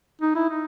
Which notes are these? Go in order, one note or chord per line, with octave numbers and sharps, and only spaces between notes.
D#4
E4
D#4